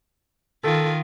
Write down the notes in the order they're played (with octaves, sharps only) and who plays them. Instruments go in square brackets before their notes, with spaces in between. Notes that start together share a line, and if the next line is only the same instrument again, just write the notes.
[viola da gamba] D#3 F4 [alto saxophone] A4